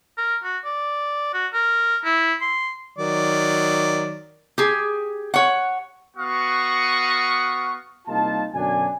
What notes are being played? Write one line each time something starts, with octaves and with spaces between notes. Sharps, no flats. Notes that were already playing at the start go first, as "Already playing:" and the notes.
A#4
F#4
D5
F#4
A#4
E4
C6
D#3 F#3 D5
G4 G#4
C#5 F#5
B3 F#4 F5 F#5 C#6 D#6
C2 G3 A#3 D#4 F4 A5
F#2 B2 D3 D4 G#5